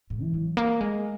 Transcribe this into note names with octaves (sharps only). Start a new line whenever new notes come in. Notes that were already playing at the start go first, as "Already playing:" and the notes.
G#2
E3
F#3
A#3
G#3